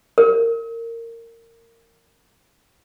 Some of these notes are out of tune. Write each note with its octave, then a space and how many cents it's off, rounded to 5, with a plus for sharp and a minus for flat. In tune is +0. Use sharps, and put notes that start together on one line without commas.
A#4 -20